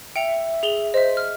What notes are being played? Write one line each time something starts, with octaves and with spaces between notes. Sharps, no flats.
E5 G5 C#7 F7
G#4 F7 G7
C5 D#5 E5
F6